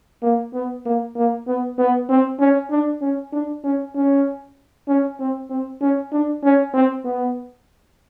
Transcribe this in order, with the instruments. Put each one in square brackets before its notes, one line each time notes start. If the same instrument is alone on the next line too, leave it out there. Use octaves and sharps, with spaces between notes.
[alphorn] A#3
B3
A#3
A#3
B3
B3
C4
C#4
D4
C#4
D4
C#4
C#4
C#4
C4
C4
C#4
D4
C#4
C4
B3